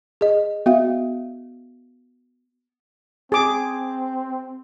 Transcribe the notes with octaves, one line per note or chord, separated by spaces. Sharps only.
G#4 D#5
B3 F#4 E5 F5
C4 G#4 D6